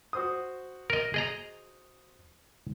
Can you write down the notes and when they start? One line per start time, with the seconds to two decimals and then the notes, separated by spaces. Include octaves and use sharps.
0.13 F#4 C5 D#6
0.90 A#4 D#5
1.14 G#4 D#5 A#5